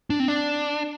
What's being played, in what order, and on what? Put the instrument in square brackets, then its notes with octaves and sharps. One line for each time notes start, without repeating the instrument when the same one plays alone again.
[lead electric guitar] D4
C4
D4